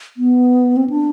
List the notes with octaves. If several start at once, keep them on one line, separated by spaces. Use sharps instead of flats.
B3
C4
D4